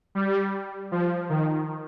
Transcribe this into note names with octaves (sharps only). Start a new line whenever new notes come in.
G3
F3
D#3